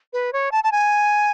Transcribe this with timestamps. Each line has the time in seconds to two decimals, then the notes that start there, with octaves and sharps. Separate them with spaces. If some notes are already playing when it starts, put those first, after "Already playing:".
0.13 B4
0.33 C#5
0.52 A5
0.64 A5
0.72 G#5